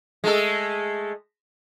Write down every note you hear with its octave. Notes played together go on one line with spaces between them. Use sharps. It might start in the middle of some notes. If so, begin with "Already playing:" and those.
G#3 A3 A4